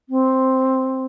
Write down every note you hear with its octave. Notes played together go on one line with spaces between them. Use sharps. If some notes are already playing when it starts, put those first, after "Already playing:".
C4